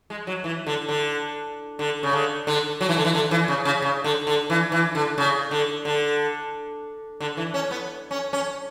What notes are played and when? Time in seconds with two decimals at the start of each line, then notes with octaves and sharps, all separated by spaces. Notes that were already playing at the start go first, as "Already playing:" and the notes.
0.10 G#3
0.27 F#3
0.44 E3
0.66 D3
0.89 D3
1.79 D3
2.03 C#3
2.13 D3
2.47 D3
2.81 F#3
2.89 E3
2.97 D3
3.05 E3
3.15 D3
3.31 E3
3.48 C#3
3.65 C#3
3.82 C#3
4.04 D3
4.27 D3
4.50 E3
4.72 E3
4.95 D3
5.18 C#3
5.51 D3
5.85 D3
7.20 D3
7.37 E3
7.54 C#4
7.71 B3
8.11 C#4
8.33 C#4